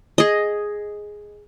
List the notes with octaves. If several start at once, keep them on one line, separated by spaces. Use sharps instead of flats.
G#4 D#5